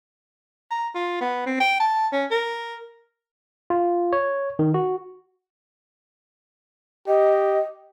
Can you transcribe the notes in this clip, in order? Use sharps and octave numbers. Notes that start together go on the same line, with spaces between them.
A#5
F4
B3
C4
G5
A5
C#4
A#4
F4
C#5
D#3
F#4
G4 D#5